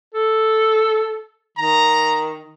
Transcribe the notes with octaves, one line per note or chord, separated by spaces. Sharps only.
A4
D#3 A#5